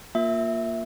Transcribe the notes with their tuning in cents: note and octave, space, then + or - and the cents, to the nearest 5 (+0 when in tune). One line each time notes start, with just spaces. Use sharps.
A#3 +0 F4 +10 E5 +0